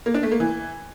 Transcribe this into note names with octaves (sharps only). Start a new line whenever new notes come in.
A#3
D4
A3
A#3
E3